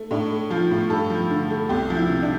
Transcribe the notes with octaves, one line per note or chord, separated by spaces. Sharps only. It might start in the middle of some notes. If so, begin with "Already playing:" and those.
Already playing: A3
A2 D4
A3
F3 F4
A2
G2 A4
F3
D3
A3
C2 G4
F3
E4
C3
D4